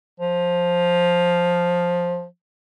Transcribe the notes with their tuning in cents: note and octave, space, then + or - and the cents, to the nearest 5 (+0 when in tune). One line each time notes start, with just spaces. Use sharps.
F3 +10